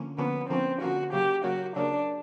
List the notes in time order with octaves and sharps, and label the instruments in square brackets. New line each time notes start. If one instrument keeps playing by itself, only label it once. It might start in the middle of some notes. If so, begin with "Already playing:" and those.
Already playing: [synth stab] D3 F3 A#3 C#4
[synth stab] D3 F3 A#3 C#4 [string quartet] B3
[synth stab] D3 F3 A#3 C#4 [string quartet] C4
[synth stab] D3 F3 A#3 C#4 [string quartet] F#4
[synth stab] C#3 F#3 A#3 [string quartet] G4
[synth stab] C#3 F#3 A#3 [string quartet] F#4
[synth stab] C#3 F#3 A#3 [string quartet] D4